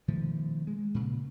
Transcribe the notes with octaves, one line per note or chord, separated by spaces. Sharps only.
B2 D#3 F3 A3
G#3
A#2 C#3